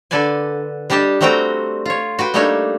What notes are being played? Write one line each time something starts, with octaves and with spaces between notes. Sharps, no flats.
D3 A4 B4 D5 G#5
G3 D4 G4 D#5 A5
G3 A3 C4 F#4 G5 A#5
F4 C#5
F#4 B4 G5
G3 A3 A#3 D4 D#4 C#5